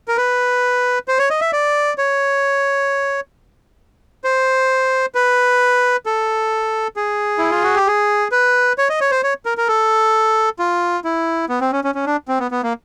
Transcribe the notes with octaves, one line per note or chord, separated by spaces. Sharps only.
A#4
B4
C5
C#5
D#5
E5
D5
C#5
C5
B4
A4
G#4
E4
F4
F#4
G4
G#4
B4
C#5
D#5
C#5
C5
C#5
A#4
A#4
A4
F4
E4
B3
C4
C#4
C#4
C#4
D4
C4
B3
B3
A#3